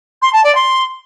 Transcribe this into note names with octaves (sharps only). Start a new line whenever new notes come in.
C6
A5
D5
C6